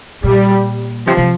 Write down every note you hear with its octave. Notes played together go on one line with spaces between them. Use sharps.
A#2 G3
C3 F3
C3